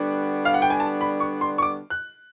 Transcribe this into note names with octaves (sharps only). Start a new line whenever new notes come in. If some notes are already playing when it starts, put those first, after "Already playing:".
Already playing: D3 G3 B3 D4 F#4
F5
F#5
G5
G#5
A5
B5
C#6
C6
C#6
D6
F#6